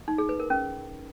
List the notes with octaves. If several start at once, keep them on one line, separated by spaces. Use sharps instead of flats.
D#4
G#4
B4
A#4
C#4